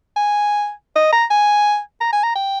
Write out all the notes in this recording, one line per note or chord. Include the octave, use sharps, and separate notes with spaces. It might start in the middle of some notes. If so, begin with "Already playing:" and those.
G#5
D#5
A#5
G#5
A#5
G#5
A#5
G5